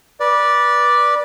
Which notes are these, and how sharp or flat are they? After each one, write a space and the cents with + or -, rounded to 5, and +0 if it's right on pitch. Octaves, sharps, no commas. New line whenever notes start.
B4 -25 D5 +0